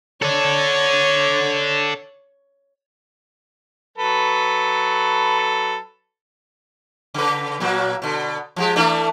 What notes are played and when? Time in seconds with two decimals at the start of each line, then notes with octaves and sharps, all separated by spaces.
0.22 A4 C#5 D5
3.98 F#3 A4 B4
7.14 C#3 B4
7.60 A#2 F#3 A#3
8.02 B2 D3
8.56 F3 G#3 G4
8.76 E3 A3 D4